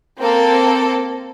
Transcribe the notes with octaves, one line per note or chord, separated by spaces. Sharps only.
A#3 C4 A4